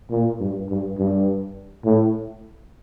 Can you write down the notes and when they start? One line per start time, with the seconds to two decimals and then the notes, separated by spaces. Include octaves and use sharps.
0.10 A#2
0.40 G2
0.70 G2
0.98 G2
1.85 A2